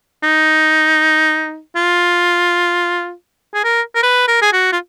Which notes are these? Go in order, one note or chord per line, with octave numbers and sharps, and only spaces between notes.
D#4
F4
G#4
A#4
A#4
B4
A#4
G#4
F#4
F4